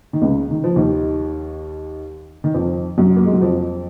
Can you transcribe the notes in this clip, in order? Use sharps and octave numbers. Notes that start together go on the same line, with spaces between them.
D#3
C#2 C#3
D#3
F3
D#2 D#3
D#3
F2 F3
F#2 F#3
A#3
G#3
F#3
F2 F3